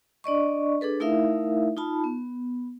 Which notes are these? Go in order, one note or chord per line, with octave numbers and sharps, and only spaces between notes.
D4 D5 D#5 C#6
D4 G#4 A4 B4
A3 D#4 E4 A#4 E5 F5
D#4 F4 A5 B5
B3